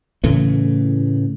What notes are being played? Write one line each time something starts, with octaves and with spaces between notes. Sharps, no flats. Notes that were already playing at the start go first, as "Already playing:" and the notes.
A2 C#3 E3 A3